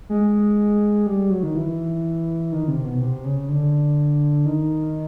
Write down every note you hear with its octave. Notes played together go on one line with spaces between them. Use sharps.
G#3
G3
F#3
D#3
E3
D#3
C3
B2
C3
C#3
D3
D#3